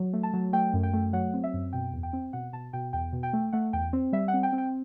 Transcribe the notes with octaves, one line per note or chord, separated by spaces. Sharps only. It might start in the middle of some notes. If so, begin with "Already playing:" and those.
Already playing: F#3
A3
A5
F#3
A3 G5
F#2
G5
A3
F#3 F#5
C4
E5
F#2
B2 G5
E2
G5
C4
B2 F#5
B2 A5
B2 G5
E2 G5
B2
G5
A3
A3 F#5
E2 G5
C4
G3 E5
F#5
C4
G5
C4
G5